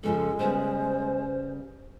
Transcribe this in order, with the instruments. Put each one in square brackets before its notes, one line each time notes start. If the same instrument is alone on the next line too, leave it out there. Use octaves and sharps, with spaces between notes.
[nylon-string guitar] F2 C#3 F3 [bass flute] G#3 [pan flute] A4
[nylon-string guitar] C#3 G3 B3 [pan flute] C5